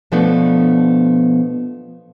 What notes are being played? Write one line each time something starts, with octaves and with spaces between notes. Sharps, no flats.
B2 F3 A3 B3 D4